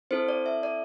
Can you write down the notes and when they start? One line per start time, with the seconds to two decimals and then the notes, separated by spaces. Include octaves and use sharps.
0.11 C4 E4 A4 C5
0.28 D5
0.46 E5
0.63 D5